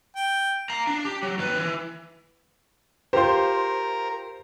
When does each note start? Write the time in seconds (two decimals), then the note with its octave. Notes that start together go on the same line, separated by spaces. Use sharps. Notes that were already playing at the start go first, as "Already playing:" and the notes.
0.16 G5
0.70 F5 A#5
0.87 D4
1.05 G4
1.23 F#3
1.38 D#2 B4
1.59 E3
3.13 F4 G4 A#4 C5 C6